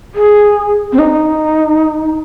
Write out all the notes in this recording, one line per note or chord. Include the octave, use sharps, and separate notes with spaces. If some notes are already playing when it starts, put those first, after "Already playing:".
G#4
C4
D#4